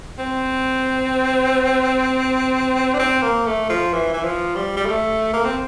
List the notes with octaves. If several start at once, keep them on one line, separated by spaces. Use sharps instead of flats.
C4
D4
C4
A#3
A3
F3
E3
E3
F3
G3
G3
A3
A#3
C4